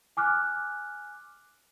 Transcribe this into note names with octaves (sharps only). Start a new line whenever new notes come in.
G#5 D6 F6 F#6